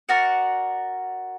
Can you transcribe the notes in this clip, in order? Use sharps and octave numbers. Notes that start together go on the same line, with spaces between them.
F#4 A#4 D5 F#5